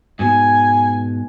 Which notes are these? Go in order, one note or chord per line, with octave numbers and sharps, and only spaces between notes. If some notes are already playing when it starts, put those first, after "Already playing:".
G#2 B2 G#5